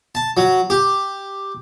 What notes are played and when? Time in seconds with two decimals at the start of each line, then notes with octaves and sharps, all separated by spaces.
0.15 A5
0.37 F#3
0.70 G4